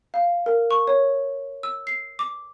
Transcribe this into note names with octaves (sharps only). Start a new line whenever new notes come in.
F5
A#4
C#6
C#5
E6
C7
D6